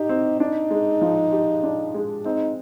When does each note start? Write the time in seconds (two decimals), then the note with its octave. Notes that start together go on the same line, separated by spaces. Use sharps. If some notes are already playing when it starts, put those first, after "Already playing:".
Already playing: D#4 G4
0.09 C4
0.40 D4 D#4
0.71 G#3
1.01 F3
1.32 G4
1.63 D4
1.95 G#3
2.25 C4 D#4